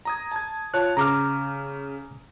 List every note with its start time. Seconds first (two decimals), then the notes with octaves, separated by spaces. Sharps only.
0.05 A#5 D#6 G#6
0.32 A5 G#6
0.74 F4 C#5 A5 F#6
0.97 C#3 A#5 D6 F6